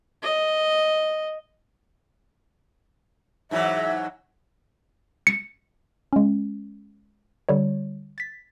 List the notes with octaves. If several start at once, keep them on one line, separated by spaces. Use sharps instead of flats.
D#5
G#2 E3 F#3 E5
C#7
G#3 C#4
D3 G3 C#5
A6 B6